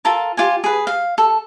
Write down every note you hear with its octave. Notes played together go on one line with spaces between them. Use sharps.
F4 A4 A#4 A5
F4 G4 G#5
G#4 B4
F5
A4